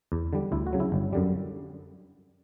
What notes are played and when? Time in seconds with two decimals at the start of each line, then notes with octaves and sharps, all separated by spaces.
0.12 E2
0.33 D3 G3
0.52 D2 E4
0.67 F#4
0.73 C#3 F#3
0.80 C#4 E4
0.92 G1
1.13 F#2 D3 G3